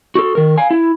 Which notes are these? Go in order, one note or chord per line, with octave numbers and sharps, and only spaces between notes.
F#4 G4 A4
D#3 A#4
F5 G#5
E4